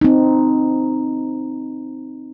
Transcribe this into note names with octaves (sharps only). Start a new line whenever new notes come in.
C4 D#4